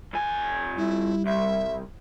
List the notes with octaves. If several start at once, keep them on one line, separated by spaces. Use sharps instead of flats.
F2 G#5
G3 E4
C2 E5